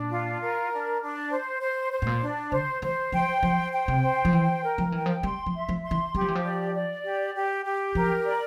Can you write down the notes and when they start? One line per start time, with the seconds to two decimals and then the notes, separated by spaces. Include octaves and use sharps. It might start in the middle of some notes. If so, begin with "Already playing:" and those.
Already playing: A#2 D4
0.10 F4
0.41 A#4
0.72 D4
1.02 D4
1.32 C5
1.62 C5
1.92 C5
2.02 A2
2.07 A#2
2.22 D4
2.51 D3 C5
2.82 E3 C5
3.12 F3 G5
3.43 F3 C5
3.73 G5
3.88 C3
4.03 C5
4.25 F3
4.33 E3 G5
4.64 A#4
4.78 F3
4.92 E3 G5
5.06 F3
5.23 G3 C6
5.46 F3
5.54 E5
5.69 F3
5.84 C6
5.91 E3
6.14 G3 G4
6.21 F3
6.28 E3
6.35 F3
6.44 D5
6.74 D5
7.05 G4
7.34 G4
7.64 G4
7.95 F3 A#4
8.26 D5